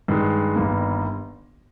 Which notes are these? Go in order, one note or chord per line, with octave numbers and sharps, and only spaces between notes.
G2 D#3 G#3
G1 G2 D#3 A#3